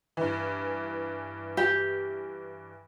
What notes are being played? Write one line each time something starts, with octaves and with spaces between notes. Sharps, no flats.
G2 E3
G4